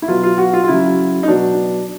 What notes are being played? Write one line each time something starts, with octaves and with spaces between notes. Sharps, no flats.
E4
B2 F#3 F4
F4
F#4
F4
F4
C#3 F#3 E4
D#4
B2 F#3 D4